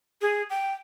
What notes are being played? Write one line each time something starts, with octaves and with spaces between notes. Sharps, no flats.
G#4
G5